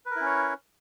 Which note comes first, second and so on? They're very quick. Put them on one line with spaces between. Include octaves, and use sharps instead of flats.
B4 A#4 E4 C#4 C#5